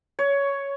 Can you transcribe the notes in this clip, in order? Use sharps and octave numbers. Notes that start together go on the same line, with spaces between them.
C#5